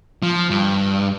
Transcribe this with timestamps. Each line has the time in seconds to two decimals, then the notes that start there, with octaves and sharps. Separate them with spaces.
0.23 F3
0.50 G2